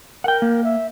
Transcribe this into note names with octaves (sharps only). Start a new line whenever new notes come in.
A#4 F#5 G5
A#3
E5